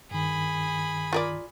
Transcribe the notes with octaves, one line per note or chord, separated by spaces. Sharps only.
G2 D#3 G#4 B5
F4 A#4 D5